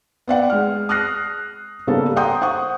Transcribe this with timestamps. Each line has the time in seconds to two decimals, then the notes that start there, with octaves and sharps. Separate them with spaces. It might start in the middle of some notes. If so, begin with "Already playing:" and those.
0.28 B3 D5 F#5 G5
0.50 G#3 F6
0.89 D#6 F6 F#6 A#6 C7
1.87 C#3 G3 A#3 B3 A4
2.16 F#5 G5 A#5 C6 D#6 G6
2.41 C5 F#5 C#6 D#6